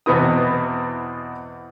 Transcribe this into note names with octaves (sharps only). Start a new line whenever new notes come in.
E2 B2 B3 C4 E4 D#6